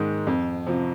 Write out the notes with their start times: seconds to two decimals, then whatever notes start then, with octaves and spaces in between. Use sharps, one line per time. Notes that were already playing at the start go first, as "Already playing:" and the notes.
Already playing: G#2 D#3 G#3
0.27 F2
0.67 C3 F3